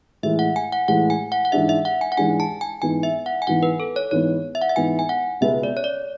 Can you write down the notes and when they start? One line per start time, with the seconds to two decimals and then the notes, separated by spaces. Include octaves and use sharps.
0.23 A2 E3 G#3 E5
0.39 F#5
0.56 G#5
0.72 F#5
0.88 A2 E3 G#3 F#5
1.10 G#5
1.32 F#5
1.45 F#5
1.52 G#2 E3 G#3 D4 E5
1.69 E5
1.85 F#5
2.01 G#5
2.12 F#5
2.17 G#2 E3 G#3 D4 G#5
2.40 A5
2.61 G#5
2.82 G#2 E3 B3 G#5
3.03 E5
3.26 F#5
3.42 G#5
3.47 G#2 E3 B3 F#5
3.63 B4
3.80 A4
3.96 C#5
4.11 G#2 E3 B3 C#5
4.55 E5
4.62 F#5
4.69 E5
4.76 G#2 E3 B3 G#5
4.99 G#5
5.09 F#5
5.41 C#2 B2 G#3 B3 E5
5.63 D5
5.77 C#5
5.84 D5